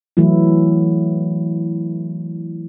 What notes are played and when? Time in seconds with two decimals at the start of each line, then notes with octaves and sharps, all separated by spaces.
0.17 E3 F#3 A3 E4